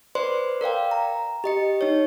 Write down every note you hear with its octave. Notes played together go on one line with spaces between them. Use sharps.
B4 C5 D5 C6
A#4 D5 F5 G5
A#5
G4 D#5 C#7
D#4 C#5